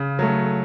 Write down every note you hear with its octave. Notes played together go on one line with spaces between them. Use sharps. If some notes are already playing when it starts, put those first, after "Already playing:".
Already playing: C#3
F#3 A3